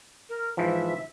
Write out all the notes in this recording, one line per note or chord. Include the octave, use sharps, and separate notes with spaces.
A#4
G#2 E3 F3 E5